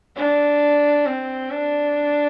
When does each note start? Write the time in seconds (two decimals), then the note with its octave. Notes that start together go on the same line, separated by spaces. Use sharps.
0.16 D4
1.06 C4
1.51 D4